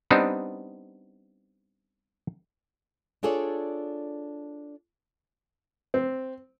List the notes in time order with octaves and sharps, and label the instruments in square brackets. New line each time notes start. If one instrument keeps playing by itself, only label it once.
[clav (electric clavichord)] G3 B3 C4 D4 D#4
[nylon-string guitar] D4 F4 G#4 A4 C#5 D5
[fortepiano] C4